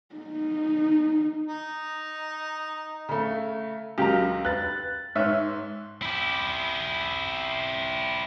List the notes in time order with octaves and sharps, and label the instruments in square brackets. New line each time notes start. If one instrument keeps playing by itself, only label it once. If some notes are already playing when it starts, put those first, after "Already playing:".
[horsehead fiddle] D#4
[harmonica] D#4
[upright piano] C#3 A3 [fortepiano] A#5
[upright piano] C#2 [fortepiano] C#3 F#3 [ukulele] G4 A#4 A#5
[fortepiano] B4 [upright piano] F#6 A6
[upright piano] G#2 [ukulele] B4 [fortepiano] C#5 E5 F6
[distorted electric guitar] E4 G4